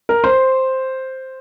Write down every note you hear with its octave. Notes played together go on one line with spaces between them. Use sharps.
A#4
C5